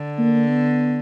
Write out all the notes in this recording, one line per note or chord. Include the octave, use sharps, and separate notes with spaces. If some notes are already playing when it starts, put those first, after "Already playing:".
Already playing: D3
A#3
B3